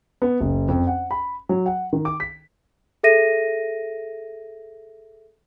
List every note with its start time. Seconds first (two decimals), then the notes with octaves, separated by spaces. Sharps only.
0.22 B3
0.40 F#1
0.68 F2
0.87 F#5
1.11 B5
1.49 F#3
1.66 F#5
1.93 D#3
2.05 D6
2.20 B6
3.03 G#4 A4 E5 A#6 D#7